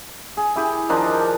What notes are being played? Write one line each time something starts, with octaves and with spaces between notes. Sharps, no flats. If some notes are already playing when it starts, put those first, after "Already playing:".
G#4
E4 G4 G#4
D#3 F3 D4 D#4